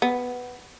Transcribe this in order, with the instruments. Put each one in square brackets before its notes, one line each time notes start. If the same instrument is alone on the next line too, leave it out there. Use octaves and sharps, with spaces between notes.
[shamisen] B3